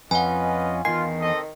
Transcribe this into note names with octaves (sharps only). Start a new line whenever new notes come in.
F2 C#4 F4 B4 D#5 F#5 G#5
E2 G2 D#3 F4 G#5 C7
C4 A4 D#5